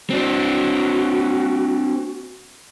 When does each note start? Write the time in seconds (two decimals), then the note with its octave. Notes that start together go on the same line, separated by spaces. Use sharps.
0.10 C4 D4 F#4